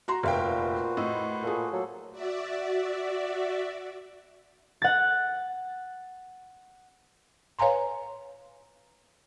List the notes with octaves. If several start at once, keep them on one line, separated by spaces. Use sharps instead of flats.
F#4 A#5 C6
F1 A#2 F#4 B4 C5 E5 F5 G5
A2 D#5 E6
A#2 A3 G#4
F#3 A#3 A4
F#4 D5 E5
F#5 A6
B4 C#5 F5 G#5 A#5 C6